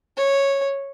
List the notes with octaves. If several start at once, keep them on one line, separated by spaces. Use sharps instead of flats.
C#5